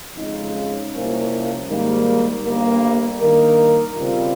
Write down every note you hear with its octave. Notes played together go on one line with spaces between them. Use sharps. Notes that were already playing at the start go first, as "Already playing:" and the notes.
F2 C#3 G#3 D#4
C2 C3 F3 A#3 C#4
G#2 D#3 G3 A#3
G1 G2 G3 A#3
G2 D#3 A#3 D#4 A#4
C#3 G3 C4 F4